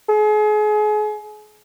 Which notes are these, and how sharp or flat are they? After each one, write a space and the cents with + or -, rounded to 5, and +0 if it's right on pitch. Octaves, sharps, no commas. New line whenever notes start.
G#4 +35